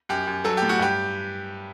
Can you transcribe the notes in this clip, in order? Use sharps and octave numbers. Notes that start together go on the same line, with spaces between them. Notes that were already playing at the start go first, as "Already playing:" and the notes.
F#2 G4
F#2
F#3 A4
A2 G4
F#4
G2 G4